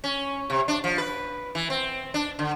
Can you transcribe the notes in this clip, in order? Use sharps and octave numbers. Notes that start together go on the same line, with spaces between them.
C#4
C3
D4
F3
B4
E3
C4
D4
D3